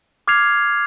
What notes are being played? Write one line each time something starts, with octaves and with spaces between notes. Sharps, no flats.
D6 F6 G#6 C7 F7